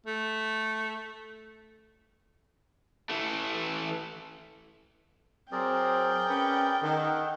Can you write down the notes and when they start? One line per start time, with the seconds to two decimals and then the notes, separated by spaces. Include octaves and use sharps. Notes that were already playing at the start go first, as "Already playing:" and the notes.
0.06 A3
3.10 E3 A3
5.52 F#3 C4 G#4 A#4 D5 G5
6.29 C#4 B4
6.83 D#3 A4 F#5